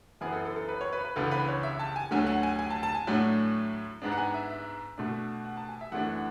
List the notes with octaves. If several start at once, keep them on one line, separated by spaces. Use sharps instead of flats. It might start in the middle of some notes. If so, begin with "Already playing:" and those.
F#2 E3 B3 G#4
A4
A4
A4
B4
C#5
B4
B4
C#2 C#3 E3 B3 D4 A4
B4
C#5
E5
A5
G#5
D2 D3 F#3 A3 G#5
F#5
G#5
G#5
A5
A5
G#5
A2 F#3 A3 D4
G#2 G#3 B3 D4
F#5
G#5
E5
E5
B2 A3 D4
F#5
A5
G#5
E5
F#2 E3 A3 D4 F#5
F#5